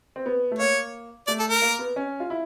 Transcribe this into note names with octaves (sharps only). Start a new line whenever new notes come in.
C4
B3
A3
A#3 C#5
A3 D5
A4
A#4
A#3
B3
C#4
F4
E4